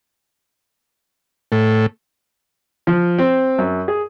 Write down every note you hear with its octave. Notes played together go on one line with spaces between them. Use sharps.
A2
F3
C4
F#2
G#4